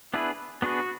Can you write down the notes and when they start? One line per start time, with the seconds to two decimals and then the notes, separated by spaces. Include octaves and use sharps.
0.13 B3 D4 E4 G#4 B4
0.62 B3 D4 F#4 G#4 B4